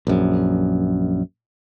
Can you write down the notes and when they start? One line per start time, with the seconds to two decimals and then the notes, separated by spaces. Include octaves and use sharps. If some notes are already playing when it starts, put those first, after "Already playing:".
0.07 A#1 F#2